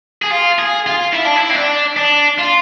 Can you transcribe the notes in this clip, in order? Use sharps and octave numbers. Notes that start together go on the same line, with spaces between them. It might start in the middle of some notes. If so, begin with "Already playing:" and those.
G#4
F4
G#4
F4
E4
D4
E4
C4
D4
D4
F4